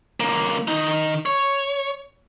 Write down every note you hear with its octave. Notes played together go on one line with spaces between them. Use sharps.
C#2 A#3
D#3 D#4
C#5